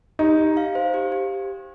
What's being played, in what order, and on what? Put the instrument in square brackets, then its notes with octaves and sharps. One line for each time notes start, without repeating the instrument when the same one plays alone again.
[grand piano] D#4 [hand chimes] G4
[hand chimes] G4
F5
C5
G4
G4